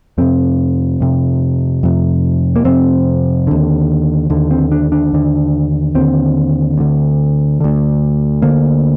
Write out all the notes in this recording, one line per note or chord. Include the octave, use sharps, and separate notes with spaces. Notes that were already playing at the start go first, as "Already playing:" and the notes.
F2 C3 C4
F2 C3
F2 C3
A#3
F2 C3 C4
D#2 D3
D#2 D3
C4
D4
D4
D#2 D3
D#2 D3 C4
D2 D3
D2 D3
D2 D3 A#3